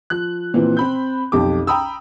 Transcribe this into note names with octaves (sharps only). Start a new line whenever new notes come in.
F3 F#6
A#2 E3 F3 C4
C4 B5 G6
B1 F2 G4 D6
G5 A#5 B5 D#6 E6